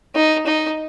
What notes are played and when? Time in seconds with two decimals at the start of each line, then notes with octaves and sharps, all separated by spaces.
0.15 D#4
0.46 D#4